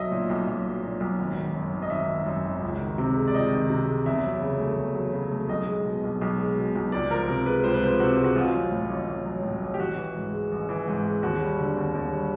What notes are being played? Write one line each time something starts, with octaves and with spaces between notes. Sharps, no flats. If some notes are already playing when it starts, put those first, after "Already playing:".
Already playing: B1 F#3 D#5 E5
A#2
B1
B1
F#3
A#2
B1
G#1
D#3
F#2
G#1
D#5
G#1 E5
D#3
F#2
G#1
C#2
D#3
C3
G#3
D5
C#2 D#5
D#3
C3
G#3
E2 E5
F#3
C#3
A3
E2
F#3
C#3
A3
B1 D#5
G#3
B2
B1
B1
G#3
B2
B1
C#2 D5
F3 A#4
C3 A#4
G#3 B4
C#2 C5
B4
F3 C5
C3 F#4
G#3
F#4
A1 F4
F#3
A2
A1
A1
F#3
A2
A1
G4
A1 F#4
E3
G#2
G#3
A1
E3
G#2
G#3
D#2 F#4
G3
D3
D#2
D#2
G3